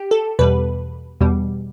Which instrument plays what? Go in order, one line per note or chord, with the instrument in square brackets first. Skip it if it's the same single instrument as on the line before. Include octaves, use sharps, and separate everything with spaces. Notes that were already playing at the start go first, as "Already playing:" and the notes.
Already playing: [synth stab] G4
A4
E2 B2 G3 B4
E2 B2 G3